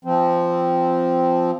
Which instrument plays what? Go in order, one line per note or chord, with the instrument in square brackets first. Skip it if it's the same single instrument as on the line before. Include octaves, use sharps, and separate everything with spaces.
[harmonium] F3 C4